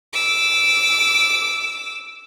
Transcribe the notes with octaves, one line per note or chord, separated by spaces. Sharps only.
D6 E6